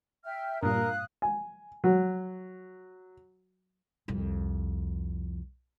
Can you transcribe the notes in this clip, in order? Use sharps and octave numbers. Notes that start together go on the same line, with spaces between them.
E5 G5 F6
G2 A#2 A#4 F5 D#6 F#6
G#5
F#3
C2 F2